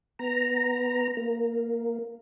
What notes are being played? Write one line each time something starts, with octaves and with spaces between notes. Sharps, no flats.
B3 A#5
A#3